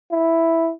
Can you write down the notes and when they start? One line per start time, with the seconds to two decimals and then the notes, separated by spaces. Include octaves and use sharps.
0.11 E4